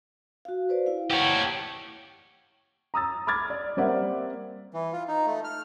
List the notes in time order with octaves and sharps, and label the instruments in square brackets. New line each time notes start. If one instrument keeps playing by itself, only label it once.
[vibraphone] F#4 F5
B4 C5 D5
E4 F5
[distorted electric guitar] G4 C#5 [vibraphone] F#5 A5
[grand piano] A#5 D#6 E6 A6
B5 D6 F6 G#6 A6
D5
G3 A#3 C4 D5 E5 F#5
[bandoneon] E3
F4
D#4
A3
F6